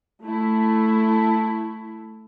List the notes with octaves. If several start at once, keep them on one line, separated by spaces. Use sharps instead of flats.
A3 E4